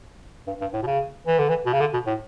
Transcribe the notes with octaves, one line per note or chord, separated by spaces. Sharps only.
G2
G2
A2
B2
C#3
E3
D3
E3
B2
C#3
D3
B2
A2